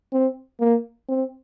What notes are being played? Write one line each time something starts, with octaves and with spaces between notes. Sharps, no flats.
C4
A#3
C4